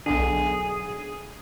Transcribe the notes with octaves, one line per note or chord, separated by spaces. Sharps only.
B1 D3 G#4